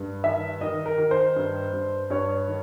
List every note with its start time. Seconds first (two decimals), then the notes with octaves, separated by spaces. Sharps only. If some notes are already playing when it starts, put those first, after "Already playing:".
Already playing: G2
0.24 D#3 E5
0.61 D#3 D#5
0.86 A#4
0.98 D#3
1.11 C5
1.36 G2
1.73 G2
2.10 G2 C#5
2.48 D#3